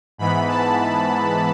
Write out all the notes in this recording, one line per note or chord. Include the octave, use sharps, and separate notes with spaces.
G#2 E3 B3 B5
A5